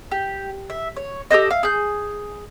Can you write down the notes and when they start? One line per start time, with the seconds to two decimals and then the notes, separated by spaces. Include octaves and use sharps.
0.11 G4
0.70 E5
0.96 C#5
1.31 G4 A4 C5 D#5
1.51 F5
1.63 G#4 G6